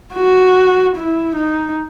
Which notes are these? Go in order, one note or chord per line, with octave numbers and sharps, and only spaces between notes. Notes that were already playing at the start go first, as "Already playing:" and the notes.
F#4
E4
D#4